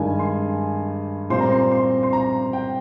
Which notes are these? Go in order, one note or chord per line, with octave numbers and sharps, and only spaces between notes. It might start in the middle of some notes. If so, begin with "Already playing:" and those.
Already playing: G2 D#3 G#3 D#4 G#5
C6
A#2 G3 C4 C6
A#5
C6
C6
C6
A#5
G5